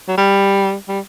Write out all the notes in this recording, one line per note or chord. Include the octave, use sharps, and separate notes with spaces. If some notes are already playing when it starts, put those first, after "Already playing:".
F#3
G3
G3